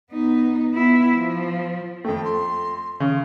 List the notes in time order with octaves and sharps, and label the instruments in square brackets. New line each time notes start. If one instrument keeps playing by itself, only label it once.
[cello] B3 D#4
B3 E4
F3
[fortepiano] F2 A3 [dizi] G5
[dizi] C6
[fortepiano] C#3